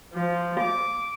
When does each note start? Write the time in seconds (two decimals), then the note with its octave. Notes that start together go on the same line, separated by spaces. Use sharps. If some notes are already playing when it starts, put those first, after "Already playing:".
0.13 F3
0.59 D6